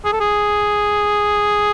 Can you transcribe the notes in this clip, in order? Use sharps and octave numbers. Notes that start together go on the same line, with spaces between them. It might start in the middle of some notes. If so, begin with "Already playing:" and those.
G#4
A4
G#4